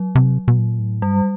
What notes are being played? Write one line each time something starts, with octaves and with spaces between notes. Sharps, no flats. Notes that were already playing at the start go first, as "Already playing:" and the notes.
Already playing: F#3
C3
B2
A#2
A2
G2 G3